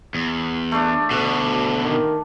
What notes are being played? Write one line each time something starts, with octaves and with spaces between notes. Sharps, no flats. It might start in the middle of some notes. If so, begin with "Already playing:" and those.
E2
A3 D4
D2 B2 D3
D#3